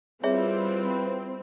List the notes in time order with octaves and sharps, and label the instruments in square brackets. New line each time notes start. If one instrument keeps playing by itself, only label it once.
[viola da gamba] G3 E4 F4 [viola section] C4 [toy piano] G#4 C#5 E5 [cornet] B4